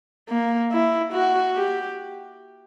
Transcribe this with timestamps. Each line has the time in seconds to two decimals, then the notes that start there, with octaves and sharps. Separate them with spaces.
0.29 A#3
0.72 E4
1.13 F#4
1.57 G4